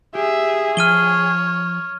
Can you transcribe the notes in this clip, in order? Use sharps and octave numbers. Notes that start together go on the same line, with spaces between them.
G4 G#4 E5
F3 C#5 A5 F6 D#7 G7